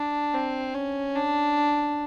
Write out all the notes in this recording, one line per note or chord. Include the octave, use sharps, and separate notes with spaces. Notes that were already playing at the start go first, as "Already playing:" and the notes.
Already playing: D4
C4
C#4
D4